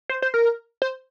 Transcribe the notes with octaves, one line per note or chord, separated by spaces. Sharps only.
C5
C5
A#4
C5